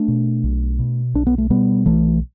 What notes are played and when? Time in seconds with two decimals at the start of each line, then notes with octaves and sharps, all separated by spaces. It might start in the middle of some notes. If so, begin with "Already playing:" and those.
Already playing: A3 D4
0.08 B2
0.44 B1
0.79 B2
1.14 B1 D4
1.27 B3
1.38 A3
1.50 B2 G3 B3
1.86 B1 E3 A3